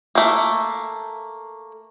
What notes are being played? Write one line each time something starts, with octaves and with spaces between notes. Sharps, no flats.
A3 A#3